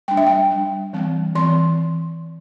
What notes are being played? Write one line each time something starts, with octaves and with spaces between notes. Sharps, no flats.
G3 D4 G5
E5
G5
G3 D4
E3 G3 C4
E3 C4 C6